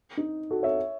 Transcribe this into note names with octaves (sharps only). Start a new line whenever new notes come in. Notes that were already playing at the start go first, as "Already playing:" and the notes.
D#4
F#4 A4
C#5 E5